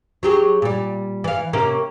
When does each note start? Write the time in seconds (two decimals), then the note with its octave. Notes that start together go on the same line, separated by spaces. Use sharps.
0.23 F#3 G4 G#4
0.62 A#2 G3
1.24 E3 F5
1.53 C3 A#3 C#4